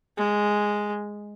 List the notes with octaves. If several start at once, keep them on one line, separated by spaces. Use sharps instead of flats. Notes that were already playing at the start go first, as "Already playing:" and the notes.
G#3